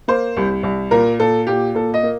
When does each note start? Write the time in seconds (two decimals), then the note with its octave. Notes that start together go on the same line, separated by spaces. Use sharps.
0.08 A#3 C5
0.37 C2
0.63 C2
0.91 A#2 A#4
1.20 A#2 A4
1.47 A#2 G4
1.75 A#2 A4
1.94 D#5
2.03 A#3